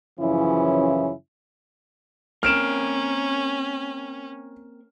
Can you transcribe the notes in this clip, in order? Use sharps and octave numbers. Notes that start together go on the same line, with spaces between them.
F#2 C#3 E3 F3 C#4 E4
A#3 C4 C#4 A#4 F6 D7 E7